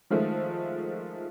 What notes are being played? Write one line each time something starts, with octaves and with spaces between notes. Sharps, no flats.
D#3 F3 G#3 A3